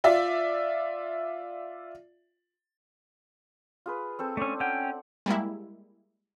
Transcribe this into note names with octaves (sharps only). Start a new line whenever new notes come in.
F4 D5 E5
F4 G#4 B4
C4 A4 C5
A3 C#4 D4
C#4 F#5 G5
G3 G#3 A#3 E4